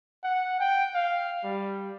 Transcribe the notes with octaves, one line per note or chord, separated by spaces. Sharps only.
F#5
G5
F5
G3